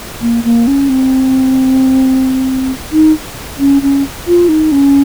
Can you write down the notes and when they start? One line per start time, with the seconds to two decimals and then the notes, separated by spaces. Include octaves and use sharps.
0.21 A#3
0.44 A#3
0.67 C#4
0.89 C4
2.92 D#4
3.59 C#4
3.82 C#4
4.27 F4
4.49 D#4
4.72 C#4